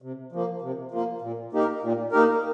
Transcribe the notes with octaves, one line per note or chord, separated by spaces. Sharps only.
C3
F3 A#3
C3
F3 A#3
A#2
A#3 D#4 G4 A#4
A#2
A#3 D#4 G4 A#4